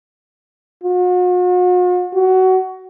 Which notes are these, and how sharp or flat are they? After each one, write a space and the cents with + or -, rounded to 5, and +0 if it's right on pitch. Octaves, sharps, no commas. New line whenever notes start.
F#4 -45
F#4 +20